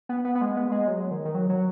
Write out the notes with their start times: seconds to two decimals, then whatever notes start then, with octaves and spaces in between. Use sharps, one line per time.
0.09 B3
0.25 B3
0.35 B3
0.41 G#3
0.57 B3
0.72 G#3
0.88 F#3
1.11 D#3
1.25 D#3
1.35 F#3
1.49 F#3